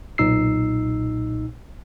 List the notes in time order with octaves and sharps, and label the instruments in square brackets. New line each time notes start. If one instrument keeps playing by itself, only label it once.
[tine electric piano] B1 A#2 D#4 E6 C7